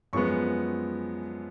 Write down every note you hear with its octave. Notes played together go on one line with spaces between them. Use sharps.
F#2 F3 G#3 B3 C#6